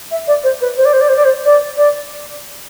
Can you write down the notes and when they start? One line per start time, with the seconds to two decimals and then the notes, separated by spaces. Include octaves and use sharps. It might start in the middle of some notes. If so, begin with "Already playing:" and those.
0.10 E5
0.27 D5
0.43 C5
0.60 B4
0.76 C5
0.85 D5
0.93 C5
1.01 D5
1.08 C5
1.15 D5
1.24 C5
1.44 D5
1.77 D5